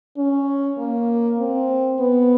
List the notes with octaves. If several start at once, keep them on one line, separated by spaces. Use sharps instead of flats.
C#4
A#3
C4
B3